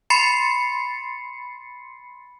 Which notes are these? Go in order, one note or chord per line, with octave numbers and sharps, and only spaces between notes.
B5 C6 A6 C7 C#7